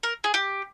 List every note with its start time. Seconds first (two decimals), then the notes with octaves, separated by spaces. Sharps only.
0.03 A#4
0.24 G#4
0.34 G4